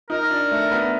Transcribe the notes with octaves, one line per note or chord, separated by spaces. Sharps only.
D#4 A#4
D4
A3
B3